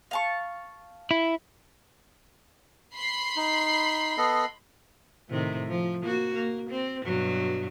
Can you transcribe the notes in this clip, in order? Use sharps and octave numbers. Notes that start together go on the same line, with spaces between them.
F5 A5 C#6
E4
B5 C6 C7
D#4
B3 A4 D#5
A2 C3 D#3
F3
A#3 F#4
A#3
C4
G2 B2 F#3